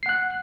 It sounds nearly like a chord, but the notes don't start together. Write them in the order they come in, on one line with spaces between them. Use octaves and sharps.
C7 F#5 F#6